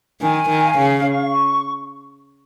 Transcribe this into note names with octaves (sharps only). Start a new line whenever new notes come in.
D#3 G#5
D#3
F5
C#3
C#6